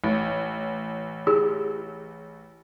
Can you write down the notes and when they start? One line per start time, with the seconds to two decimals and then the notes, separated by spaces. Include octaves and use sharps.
0.04 A1
1.27 E4 G4 G#4